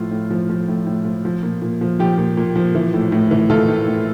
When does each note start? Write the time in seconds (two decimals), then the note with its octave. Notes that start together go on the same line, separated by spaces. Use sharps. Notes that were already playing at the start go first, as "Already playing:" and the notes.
Already playing: A2 F3 F4
0.11 A2
0.31 F3
0.50 F3
0.68 A2
0.86 A2
1.05 F3
1.25 F3
1.43 A#2
1.62 A#2
1.81 F3
1.99 F3 G4
2.18 A#2
2.37 A#2
2.56 F3
2.75 E3
2.94 A2
3.12 A2
3.31 E3
3.50 E3 F4 A4
3.68 A2
3.88 A2